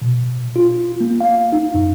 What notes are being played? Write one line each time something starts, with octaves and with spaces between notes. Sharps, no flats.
B2
F4
A#3
F5
D#4
F#2